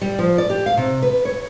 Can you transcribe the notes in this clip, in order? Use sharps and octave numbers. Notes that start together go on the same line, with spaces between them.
G3
F3
D5
G4
F5
C3
B4
C#5